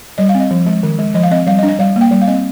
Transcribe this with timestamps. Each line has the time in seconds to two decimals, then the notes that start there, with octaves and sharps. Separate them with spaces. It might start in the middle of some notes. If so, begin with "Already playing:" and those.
0.18 G3 D#5
0.29 F5
0.35 C4
0.40 D#5
0.51 F3
0.66 G#3
0.83 D#3
0.99 G#3
1.14 F3 D#5
1.23 F5
1.31 C4 D#5
1.47 G3 F5
1.59 D#5
1.63 D4
1.69 D#5
1.79 G3 F5
1.96 A#3
2.01 G5
2.11 G3
2.21 F5
2.27 C4 D#5